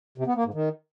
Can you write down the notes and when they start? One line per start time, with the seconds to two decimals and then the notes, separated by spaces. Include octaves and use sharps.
0.18 C3
0.27 B3
0.36 A#3
0.45 G#2
0.54 D#3